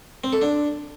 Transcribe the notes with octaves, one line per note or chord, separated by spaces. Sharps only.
C4
A4
D4